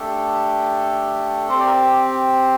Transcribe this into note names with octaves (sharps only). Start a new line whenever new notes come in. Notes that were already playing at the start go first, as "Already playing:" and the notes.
Already playing: A3 D4 G4 A4
C4 G4 C5
D5
A#4